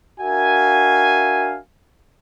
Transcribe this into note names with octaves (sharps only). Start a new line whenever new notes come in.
D4 F#4 A#4 E5 F5 G#5